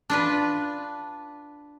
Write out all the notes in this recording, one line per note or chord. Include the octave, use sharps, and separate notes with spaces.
D4 F4 B4